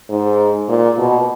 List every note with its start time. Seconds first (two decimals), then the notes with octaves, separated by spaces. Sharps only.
0.10 G#2
0.69 A#2
0.98 B2